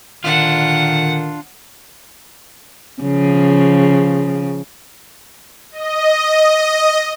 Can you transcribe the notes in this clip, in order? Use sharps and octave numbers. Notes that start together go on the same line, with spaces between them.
A#2 D3 D#3 D4 F4 F#5
C#3 F3
D#5